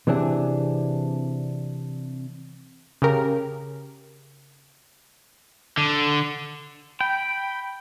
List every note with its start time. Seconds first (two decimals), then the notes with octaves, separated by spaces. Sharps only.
0.07 C3 E3 C4 D4 G#4
3.02 C#3 G4 A#4
5.77 D3
7.01 G5 B5